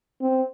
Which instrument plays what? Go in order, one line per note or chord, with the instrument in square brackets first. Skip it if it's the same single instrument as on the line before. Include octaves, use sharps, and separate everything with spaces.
[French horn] C4